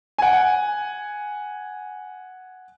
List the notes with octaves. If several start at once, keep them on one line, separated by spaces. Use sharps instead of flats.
F#5 G#5